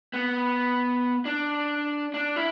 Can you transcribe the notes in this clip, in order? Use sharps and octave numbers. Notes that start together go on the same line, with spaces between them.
B3
D4
D4
E4